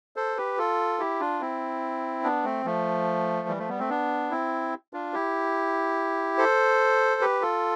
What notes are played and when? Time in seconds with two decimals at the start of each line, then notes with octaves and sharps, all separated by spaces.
0.16 A4 C5
0.37 G4 B4
0.58 F4 A4
0.99 E4 G4
1.20 D4 F4
1.41 C4 E4
2.24 B3 D4
2.44 A3 C4
2.65 F3 A3
3.48 E3 G3
3.58 F3 A3
3.69 G3 B3
3.79 A3 C4
3.89 B3 D4
4.31 C4 E4
4.93 D4 F4
5.14 E4 G4
6.38 A4 C5
7.21 G4 B4
7.42 F4 A4